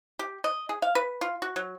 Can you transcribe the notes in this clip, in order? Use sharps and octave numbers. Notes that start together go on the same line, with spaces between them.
G4
D#5
G#4
F5
B4
F4
F#4
F#3